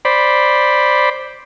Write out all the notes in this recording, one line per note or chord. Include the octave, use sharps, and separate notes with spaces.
C5 D5 B5